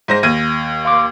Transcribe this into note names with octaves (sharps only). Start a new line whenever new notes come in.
G#2 C5 A#6
D#2 G#6 D#7
F5 C6 D6